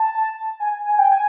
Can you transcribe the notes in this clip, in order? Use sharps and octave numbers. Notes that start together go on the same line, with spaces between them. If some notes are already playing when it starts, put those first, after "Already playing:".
Already playing: A5
G#5
G#5
G5
G#5